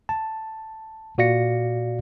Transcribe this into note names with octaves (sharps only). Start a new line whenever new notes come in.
A5
A#2 F#4 D5 F5 A#6 C#7